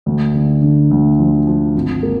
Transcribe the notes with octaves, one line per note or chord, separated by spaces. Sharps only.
D2
D3
D3
D2
F3
F3
G#1
A#3